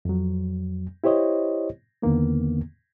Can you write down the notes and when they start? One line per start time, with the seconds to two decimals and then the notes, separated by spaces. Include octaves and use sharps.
0.05 F2 F#3
1.04 E4 G4 C5 C#5 D#5
2.02 E2 D3 D#3 A#3 B3